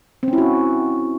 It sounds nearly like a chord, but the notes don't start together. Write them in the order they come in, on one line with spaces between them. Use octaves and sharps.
C4 C#4 E4 F#4